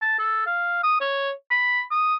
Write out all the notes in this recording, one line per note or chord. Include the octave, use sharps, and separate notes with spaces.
A5
A4
F5
D#6
C#5
B5
D#6